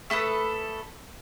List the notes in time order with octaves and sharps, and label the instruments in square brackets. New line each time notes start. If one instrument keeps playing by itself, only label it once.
[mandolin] A3 A4 B4 D#6